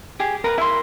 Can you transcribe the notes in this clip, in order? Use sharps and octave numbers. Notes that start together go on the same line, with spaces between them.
G4 G#4 G5
A#4 B4 A#5
E4 A#4 E5 C6